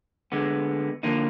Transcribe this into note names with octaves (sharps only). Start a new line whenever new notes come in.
D3 G#3 B3
D3 F3 A#3 D#4